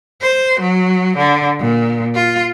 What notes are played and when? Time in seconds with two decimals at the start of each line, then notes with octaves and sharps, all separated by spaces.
0.22 C5
0.61 F#3
1.18 D3
1.59 A#2
2.15 F4